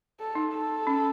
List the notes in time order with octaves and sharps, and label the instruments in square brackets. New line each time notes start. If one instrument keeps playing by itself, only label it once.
[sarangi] A4
[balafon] D#4
[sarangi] A4
[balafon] C#4